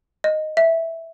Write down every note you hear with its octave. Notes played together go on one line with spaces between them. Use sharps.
D#5
E5